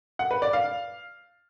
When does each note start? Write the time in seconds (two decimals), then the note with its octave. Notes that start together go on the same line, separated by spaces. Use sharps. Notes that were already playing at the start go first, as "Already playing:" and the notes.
0.19 F#5
0.31 B4
0.42 D5
0.53 F5